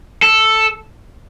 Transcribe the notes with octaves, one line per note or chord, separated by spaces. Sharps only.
A4